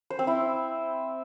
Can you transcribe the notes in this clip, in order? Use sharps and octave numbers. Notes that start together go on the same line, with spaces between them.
C5
C4
E4